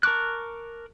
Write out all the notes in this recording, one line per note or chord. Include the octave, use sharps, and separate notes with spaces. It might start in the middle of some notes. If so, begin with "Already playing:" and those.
A#4 A5 C#6 D6 F#6